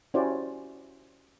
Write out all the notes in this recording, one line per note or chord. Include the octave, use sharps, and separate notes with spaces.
C#4 E4 F#4 G4 C5 D5